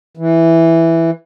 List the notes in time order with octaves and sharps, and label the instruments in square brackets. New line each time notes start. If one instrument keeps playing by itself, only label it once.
[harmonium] E3